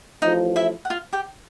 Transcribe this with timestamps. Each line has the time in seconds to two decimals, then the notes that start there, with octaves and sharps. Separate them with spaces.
0.22 A1 A2 F3 D#4 D#5
0.56 E4 E5
0.85 F#5
0.90 F4 F5
1.13 G4 G5